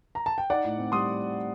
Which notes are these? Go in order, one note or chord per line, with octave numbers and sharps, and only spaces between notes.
A#5
A5
G5
D#4 D5 F#5
A2
C4
G3 C6 D#6